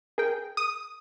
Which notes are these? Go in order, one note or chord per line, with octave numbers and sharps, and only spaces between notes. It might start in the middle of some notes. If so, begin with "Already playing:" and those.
G#4 A#4 G5
D#6